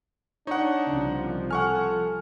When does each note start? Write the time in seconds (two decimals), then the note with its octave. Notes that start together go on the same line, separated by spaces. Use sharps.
0.47 D4 D#4 C#5 F#5
0.87 C2 C#3 F3
1.51 A4 F#5 G#5 C#6 F6